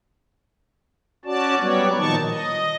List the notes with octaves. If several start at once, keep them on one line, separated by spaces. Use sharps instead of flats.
C#4 F#4 D5 A5
F#3 G3 B3 C#5 D5
A#2 D#3 F3 D#4 A5 C#6
D#5